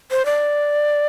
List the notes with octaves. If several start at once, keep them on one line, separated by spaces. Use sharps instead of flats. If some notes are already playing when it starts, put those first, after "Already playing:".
C5
D5